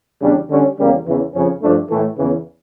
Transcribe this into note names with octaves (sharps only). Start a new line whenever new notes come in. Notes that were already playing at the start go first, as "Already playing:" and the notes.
E2 C#3 G3 D4
D3 G3 C#4
E2 C#3 G3 A#3 C#4
E2 C#3 E3
F2 C#3 F3 C#4
G2 F3 A3 D4
A2 E3 A3
E2 C#3 E3